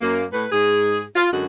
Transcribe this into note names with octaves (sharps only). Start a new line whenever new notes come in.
F#2 A#3
A2 B4
G#2 G#4
F4
F#2 D3 G#3 F#4